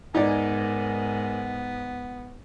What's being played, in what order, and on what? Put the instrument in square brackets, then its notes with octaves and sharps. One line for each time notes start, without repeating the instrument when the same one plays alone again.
[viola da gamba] G#2 [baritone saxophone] B3 [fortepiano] D#4 D5 [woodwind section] A#4 G#5